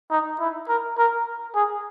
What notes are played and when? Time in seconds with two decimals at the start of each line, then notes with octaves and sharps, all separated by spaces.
0.11 D#4
0.40 E4
0.68 A#4
0.98 A#4
1.55 G#4